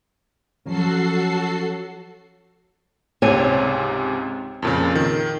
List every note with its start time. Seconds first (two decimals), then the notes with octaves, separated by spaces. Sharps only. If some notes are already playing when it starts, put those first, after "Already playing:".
0.66 F3 F#3 C#4 F#4 A4 C7
3.22 C#2 G#2 C3 C4 C#5 G#5
4.62 F2 A#2 C#3
4.95 D#3